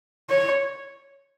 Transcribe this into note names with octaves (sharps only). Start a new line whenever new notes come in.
C#5